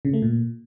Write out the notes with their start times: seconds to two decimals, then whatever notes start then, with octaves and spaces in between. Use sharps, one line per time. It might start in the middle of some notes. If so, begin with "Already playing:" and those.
0.05 C#3
0.13 A3
0.22 A#2